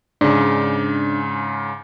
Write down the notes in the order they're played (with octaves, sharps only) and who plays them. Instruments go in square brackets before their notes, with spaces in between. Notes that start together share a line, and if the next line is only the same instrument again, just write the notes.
[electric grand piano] G#2 C#3 [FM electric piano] D4